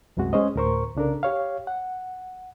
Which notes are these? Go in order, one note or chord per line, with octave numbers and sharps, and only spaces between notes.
C2 F#2 C3 G#3 F#4
G#3 C#4 C5 C#5 D#5
D2 A2 A#4 C5 C#6
C2 C#3 D4 A4 A#4
G4 C#5 F5
F#5